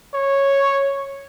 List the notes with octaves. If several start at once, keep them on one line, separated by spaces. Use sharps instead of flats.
C#5